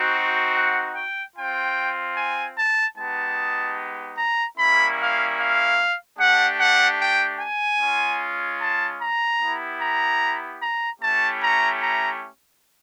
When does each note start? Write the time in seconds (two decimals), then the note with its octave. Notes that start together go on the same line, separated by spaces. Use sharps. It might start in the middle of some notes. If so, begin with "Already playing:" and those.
Already playing: C4 D#4 F#4
0.55 F#5
0.96 G5
1.36 C4 F4 G5
2.16 G#5
2.56 A5
2.97 G#3 B3 D#4 G4 A5
4.17 A#5
4.57 G3 A#3 C#4 E4 B5
4.98 F5
5.38 F5
6.18 A3 D4 G4 F#5
6.58 F#5
6.98 G5
7.39 G#5
7.79 G#3 C#4 F4
8.59 A5
8.99 A#5
9.39 B3 E4 G4
9.79 A#5
10.60 A#5
11.00 A3 C#4 E4 G4 A5
11.40 A#5
11.80 A#5